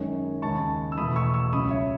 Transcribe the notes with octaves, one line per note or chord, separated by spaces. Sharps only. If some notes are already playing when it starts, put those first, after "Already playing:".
Already playing: F#2 D#3 G#3 C#4
D#2 C#3 G#3 A5 C#6
E6
E2 B2 A3 B5 D#6
C#6 E6
C#6 E6
C#2 C#3 F#3 B5 D#6
C#5 E5